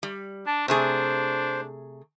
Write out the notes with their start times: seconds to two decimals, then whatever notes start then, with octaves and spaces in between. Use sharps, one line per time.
0.03 G3
0.47 D4 A5
0.68 C3 A3 D4 G#4 C5